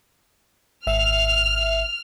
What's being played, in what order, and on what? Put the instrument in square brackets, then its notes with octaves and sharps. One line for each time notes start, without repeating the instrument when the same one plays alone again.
[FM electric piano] G#1 E5 [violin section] F6